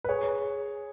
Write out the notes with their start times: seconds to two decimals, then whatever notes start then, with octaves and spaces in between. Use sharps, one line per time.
0.04 B4
0.09 G#4 C#5